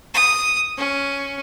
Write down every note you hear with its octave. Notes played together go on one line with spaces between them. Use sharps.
D#6
C#4